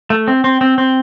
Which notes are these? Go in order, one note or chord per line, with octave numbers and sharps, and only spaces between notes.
A3
C4
C4
C4
C4